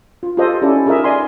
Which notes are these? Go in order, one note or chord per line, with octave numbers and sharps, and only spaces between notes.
F4
F4 G4 A4 C5 D#5
C#4 D#4 E4 G4 A4 D5
D#4 F4 G#4 A#4 D#5 E5
D#4 D5 D#5 G#5 C6